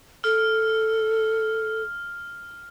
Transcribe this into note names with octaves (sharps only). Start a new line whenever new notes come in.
A4 F6